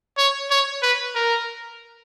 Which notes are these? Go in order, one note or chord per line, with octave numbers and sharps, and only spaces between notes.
C#5
C#5
B4
A#4